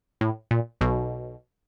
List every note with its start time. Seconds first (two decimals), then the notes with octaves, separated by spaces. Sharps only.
0.21 A2
0.51 A#2
0.81 B1 B2